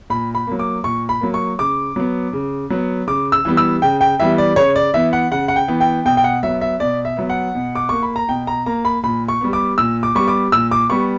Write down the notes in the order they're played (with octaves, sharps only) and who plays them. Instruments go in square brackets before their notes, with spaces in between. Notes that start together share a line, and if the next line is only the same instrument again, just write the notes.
[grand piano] A#2 B5
B5
F#3 A#3
D6
A#2 C#6
B5
F#3 A#3
C#6
C#3 D6
F#3 B3
C#3
F#3 B3
C#3 D6
E6
E3 G3 B3
E6
C#3 G5
G5
E3 G3 B3 E5
D5
C#3 C#5
D5
E3 B3 E5
F#5
C#3 F#5
F#5
G5
E3 B3
G5
B2 G5
G5
F#5
F#3 B3 E5
E5
B2 D5
E5
F#3 B3
F#5
B2
D6
A#3 C#6
B5
A#5
B2 G5
A#5
A#3 A#5
B5
A#2 B5
C#6
G3 B3
D6
A#2 E6
D6
G3 B3 C#6
D6
A#2 E6
D6
G3 B3 C#6